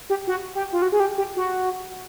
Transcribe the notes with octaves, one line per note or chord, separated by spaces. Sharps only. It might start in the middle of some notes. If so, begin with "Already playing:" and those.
G4
F#4
G4
F4
F#4
G#4
G4
G4
F#4